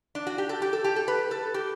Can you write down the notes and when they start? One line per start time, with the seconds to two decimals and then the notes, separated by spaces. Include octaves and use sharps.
0.15 D4
0.27 F#4
0.38 G4
0.49 A4
0.62 G4
0.73 A4
0.84 G4
0.96 A4
1.08 B4
1.31 A4
1.54 G4